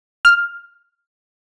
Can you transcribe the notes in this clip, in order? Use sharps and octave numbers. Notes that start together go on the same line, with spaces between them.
F6